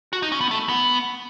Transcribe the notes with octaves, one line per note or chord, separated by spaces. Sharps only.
F#4
D#4
C#4
B3
A3
B3